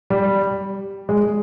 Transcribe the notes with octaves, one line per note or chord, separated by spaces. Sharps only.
G3
G#3